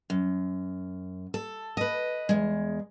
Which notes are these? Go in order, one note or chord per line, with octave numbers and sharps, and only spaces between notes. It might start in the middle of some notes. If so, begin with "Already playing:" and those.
F#2
A4
B4 D#5
E2 G#3